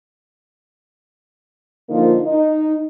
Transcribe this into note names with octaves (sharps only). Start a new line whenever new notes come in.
D3 F3 A#3 D#4 F4
D#4